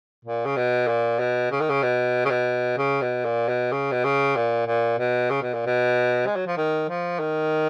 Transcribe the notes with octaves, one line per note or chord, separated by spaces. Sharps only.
A#2
C#3
B2
A#2
B2
C#3
D#3
C#3
B2
C#3
B2
C#3
B2
A#2
B2
C#3
B2
C#3
A#2
A#2
B2
C#3
B2
A#2
B2
G#3
F#3
F3
D#3
F3
D#3